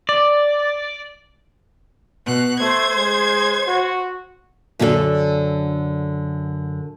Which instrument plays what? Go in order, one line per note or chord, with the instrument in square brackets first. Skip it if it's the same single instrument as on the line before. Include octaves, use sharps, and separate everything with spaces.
[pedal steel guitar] D5
[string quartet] B2 F#6
[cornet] A3 [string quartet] C5 G#6
[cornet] G#3
F#4
[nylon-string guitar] F#2 D3 D4 F4 A4